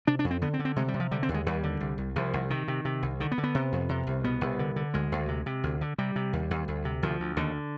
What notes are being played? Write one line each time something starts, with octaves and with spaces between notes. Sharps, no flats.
C3 D4
D4
F2
C4
D3 B3
C4
D3
C4
C3 G#3
G3
C3
F3
D3 G3
C4
D#2
G#3
D#2 G3
D3
C2
C2
C2 F3
C2
C3 D#3
C3
C3
C2
D3 D#3
B3
D3
B3
C3
F2
C3
C2
B2 B3
C2
D3
D3
D2 G#3
D2
C3
C3
D2
D3
C3 G3
C3
D#2
D#2
D2
C3
D2 F3
D2
D#2 D3